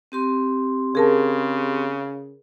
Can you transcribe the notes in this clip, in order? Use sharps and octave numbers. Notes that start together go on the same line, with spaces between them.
C4 G4 C6
C#3 G#4 A#4 A5